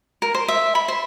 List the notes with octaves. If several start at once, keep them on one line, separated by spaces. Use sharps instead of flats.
A#4
C5
E5
B5
C5